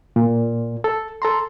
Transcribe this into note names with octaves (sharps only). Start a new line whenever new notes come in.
A#2
A4
A4 A#5 C6